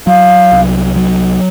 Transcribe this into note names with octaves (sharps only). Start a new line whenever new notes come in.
F#3 F5
C2
F#3